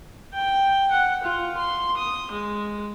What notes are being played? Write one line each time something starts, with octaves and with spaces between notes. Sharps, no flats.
G5
F#5
F4
C6
D#6
G#3